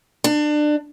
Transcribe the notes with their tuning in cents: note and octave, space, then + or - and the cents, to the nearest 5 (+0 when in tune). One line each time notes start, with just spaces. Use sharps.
D4 +25